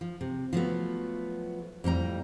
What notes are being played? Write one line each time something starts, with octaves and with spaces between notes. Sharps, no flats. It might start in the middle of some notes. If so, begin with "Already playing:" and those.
F3
C3
F3 F#3 A3 B3
F2 A2 G3 A#5